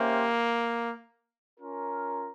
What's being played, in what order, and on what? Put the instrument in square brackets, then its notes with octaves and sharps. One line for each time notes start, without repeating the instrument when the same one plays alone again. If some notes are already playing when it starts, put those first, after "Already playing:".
Already playing: [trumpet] A#3 [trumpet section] C#4 G4 C5 E5
[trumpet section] C#4 F4 A#4